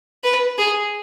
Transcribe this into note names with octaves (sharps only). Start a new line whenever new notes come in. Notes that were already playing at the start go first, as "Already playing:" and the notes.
B4
G#4